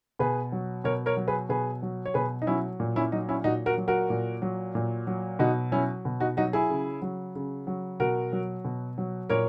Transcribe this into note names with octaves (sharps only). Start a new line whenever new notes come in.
B2 G#4 B4
F#3
B2 A#4 C#5
A#4 C#5
F#3
G#4 B4
B2 G#4 B4
F#3
C#5
B2 G#4 B4
D#4
F#3 C#4 E4
A#2
C#4 E4
F#3 D#4
C#4 E4
A#2 D#4 F#4
F#4 A#4
F#3
F#4 A#4
A#2
F#3
A#2
F#3
B2 D#4 F#4
F#3 C#4 E4
B2
D#4 F#4
F#3 D#4 F#4
E4 G#4
C#3
F#3
C#3
F#3
B2 F#4 A#4
F#3
B2
F#3
A#2 A#4 C#5